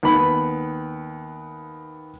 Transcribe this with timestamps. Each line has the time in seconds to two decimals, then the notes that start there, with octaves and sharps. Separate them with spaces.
0.03 D#2 B3 B5